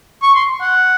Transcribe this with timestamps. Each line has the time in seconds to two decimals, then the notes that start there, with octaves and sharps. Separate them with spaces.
0.22 C#6
0.35 C6
0.61 F#5